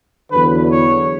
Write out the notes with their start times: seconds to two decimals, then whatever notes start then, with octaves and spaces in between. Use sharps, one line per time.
0.31 E2 D3 F#3 B4
0.70 C#5